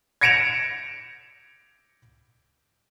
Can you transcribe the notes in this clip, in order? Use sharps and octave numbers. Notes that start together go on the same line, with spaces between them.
G#6 A#6 C#7 D7 E7 F7